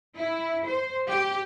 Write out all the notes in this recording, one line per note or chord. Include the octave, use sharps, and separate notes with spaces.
E4
C5
G4